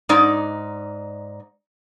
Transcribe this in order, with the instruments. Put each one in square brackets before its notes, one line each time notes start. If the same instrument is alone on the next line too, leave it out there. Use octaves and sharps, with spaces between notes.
[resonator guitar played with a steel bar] G#2 D#4 D5